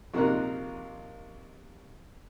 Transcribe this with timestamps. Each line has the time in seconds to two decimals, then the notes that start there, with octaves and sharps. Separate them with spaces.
0.14 A#1 C3 D#4 A#4 A#5 F#6